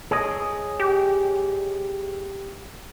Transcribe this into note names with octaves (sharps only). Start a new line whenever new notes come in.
G#4 C#5 D#5
G4